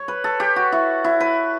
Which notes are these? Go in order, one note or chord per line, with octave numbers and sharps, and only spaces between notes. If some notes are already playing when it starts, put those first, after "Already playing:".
Already playing: C#5
B4
A4
G4
F#4
E4
E4
B4